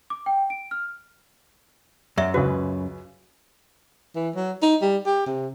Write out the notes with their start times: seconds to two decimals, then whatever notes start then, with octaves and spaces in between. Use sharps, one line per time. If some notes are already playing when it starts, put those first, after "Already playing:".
0.10 D6
0.26 G5
0.50 D7
0.71 F6
2.18 F#2 D5 E5
2.34 C#2 C#3 F#4 B4
4.15 E3
4.36 F#3
4.62 D#4
4.82 G3
5.06 G4
5.27 C3